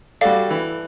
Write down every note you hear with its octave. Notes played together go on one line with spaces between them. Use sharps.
G3 F#4 A4 D5 F5
E3